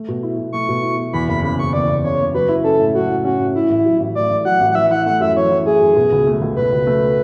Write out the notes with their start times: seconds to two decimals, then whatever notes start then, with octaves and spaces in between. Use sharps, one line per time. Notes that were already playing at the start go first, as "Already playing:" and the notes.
Already playing: A3
0.08 B2
0.23 E4
0.38 B2
0.52 A3 C#6
0.68 B2
0.83 E4
0.98 B2
1.13 E2 B5
1.28 F#1 B5
1.44 C#3 B5
1.59 F#1 C#6
1.73 E2 D5
1.89 F#1
2.04 C#3 C#5
2.20 F#1
2.34 F#3 B4
2.49 E4
2.64 C#4 A4
2.80 A2
2.94 F#3 F#4
3.09 E4
3.25 C#4 F#4
3.39 A2
3.55 A2 E4
3.69 A1
3.85 F#3
4.00 A1
4.15 A2 D5
4.30 A1
4.45 F#3 F#5
4.60 A1
4.71 F#5
4.75 E3 E5
4.91 E4 F#5
5.06 A3 F#5
5.20 F#2 E5
5.37 E3 C#5
5.51 E4
5.66 A3 G#4
5.81 F#2
5.96 B2
6.12 C#2
6.26 A3
6.41 C#2
6.56 B2 B4
6.72 C#2
6.87 A3